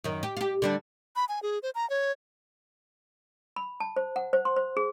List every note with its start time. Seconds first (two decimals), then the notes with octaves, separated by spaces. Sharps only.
0.04 F#2 D#3
0.23 G4
0.37 F4 G4
0.62 D3 G3 D4
1.16 B5
1.29 G#5
1.43 G#4
1.63 C5
1.75 A#5
1.90 C#5
3.56 B5
3.80 A5
3.96 C5
4.16 F#5
4.33 C5
4.45 C6
4.56 C5
4.77 G#4